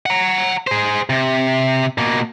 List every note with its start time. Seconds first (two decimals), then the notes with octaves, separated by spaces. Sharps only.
0.06 F#5 A#5
0.67 G#4 C5
1.10 C3
1.98 B2 A#3